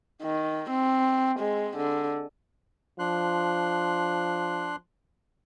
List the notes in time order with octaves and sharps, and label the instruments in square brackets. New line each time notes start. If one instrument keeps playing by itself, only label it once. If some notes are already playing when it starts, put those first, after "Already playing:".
[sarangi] D#3
C4
G#3
D3
[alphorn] F3 [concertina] D4 C6 F#6